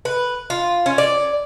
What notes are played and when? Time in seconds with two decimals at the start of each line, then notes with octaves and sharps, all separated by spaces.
0.05 B4
0.50 F4
0.86 C#4
0.98 D5